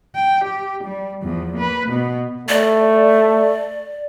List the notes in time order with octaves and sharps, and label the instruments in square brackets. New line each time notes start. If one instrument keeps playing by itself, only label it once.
[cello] G5
G4
G3
E2 F3
A#3 B4
B2 B3
[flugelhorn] A3 [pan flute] D5